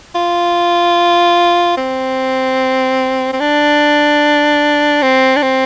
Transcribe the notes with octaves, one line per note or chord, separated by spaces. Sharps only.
F4
C4
C4
D4
C4
D4
C4